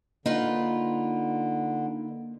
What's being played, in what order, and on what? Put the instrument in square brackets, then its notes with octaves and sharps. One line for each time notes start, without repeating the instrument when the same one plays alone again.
[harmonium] D3 [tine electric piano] A#3 [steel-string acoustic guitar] D#4 F4 B4